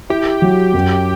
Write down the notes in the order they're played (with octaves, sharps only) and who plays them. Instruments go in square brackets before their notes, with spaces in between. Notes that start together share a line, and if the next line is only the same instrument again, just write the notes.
[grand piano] E4 [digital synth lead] G4
[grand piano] F#3
F#2